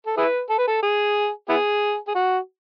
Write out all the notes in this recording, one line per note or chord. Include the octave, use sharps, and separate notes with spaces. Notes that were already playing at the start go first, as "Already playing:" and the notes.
A4
E4 G#4 B4
A4
B4
A4
G#4
B3 E4 G#4
G#4
F#4